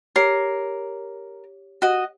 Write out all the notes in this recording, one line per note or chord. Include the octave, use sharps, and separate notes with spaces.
G4 A#4 C#5 C7
F#4 D#5